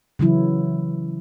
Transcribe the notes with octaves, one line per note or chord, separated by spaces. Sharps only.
C#3 E3 F#3 E4